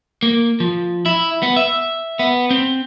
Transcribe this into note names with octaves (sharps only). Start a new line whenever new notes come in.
A#3
F3
E4
B3
E5
B3
C4